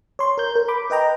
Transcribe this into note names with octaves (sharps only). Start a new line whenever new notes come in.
C#5 C6
A#4 G6
A#4
B5 D6
B4 D#5 G5 A#5